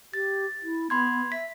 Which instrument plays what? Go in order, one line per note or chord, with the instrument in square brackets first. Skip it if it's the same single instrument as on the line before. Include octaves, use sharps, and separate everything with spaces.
[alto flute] G4 [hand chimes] A6
[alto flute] E4
[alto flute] B3 [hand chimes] B5 C6 G#6
[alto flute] E5 [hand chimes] B6